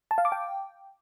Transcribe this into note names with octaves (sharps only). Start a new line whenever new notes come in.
A5
F5
D6
G5